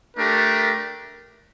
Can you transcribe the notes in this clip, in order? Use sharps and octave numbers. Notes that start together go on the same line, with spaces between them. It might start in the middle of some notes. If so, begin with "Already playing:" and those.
A3 D4 G4 A#4